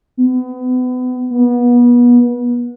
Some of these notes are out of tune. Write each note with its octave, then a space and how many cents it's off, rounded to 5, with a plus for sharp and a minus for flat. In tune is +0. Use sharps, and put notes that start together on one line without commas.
B3 +30
B3 -30